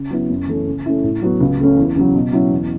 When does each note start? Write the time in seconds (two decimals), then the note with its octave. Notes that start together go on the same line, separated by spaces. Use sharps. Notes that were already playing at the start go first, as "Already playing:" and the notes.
Already playing: C#3
0.11 F#3 B3 E4
0.30 F#2
0.48 E3 A3 C#4
0.66 C#3
0.86 A3 C#4 E4
1.04 A2
1.22 F#3 B3 F#4
1.41 C#2
1.59 C#3 A3 C#4
1.77 E2
1.96 C#3 F#3
2.14 B2
2.33 F#3 C#4 E4
2.51 E2